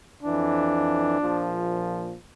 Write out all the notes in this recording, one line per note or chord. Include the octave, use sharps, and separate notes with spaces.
F2 E3 D4
A#1 A#2 F3